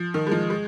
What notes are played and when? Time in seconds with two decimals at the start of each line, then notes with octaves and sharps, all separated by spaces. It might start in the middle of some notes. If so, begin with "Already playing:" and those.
Already playing: F3
0.14 D#3
0.27 G#3
0.31 F3
0.50 G#3